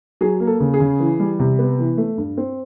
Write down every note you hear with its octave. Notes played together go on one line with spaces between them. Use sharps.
F#3 G#4
A#3
A4
C#3
G#4
C#3
E3
G3
C3
B3
E3
A3
G2
C4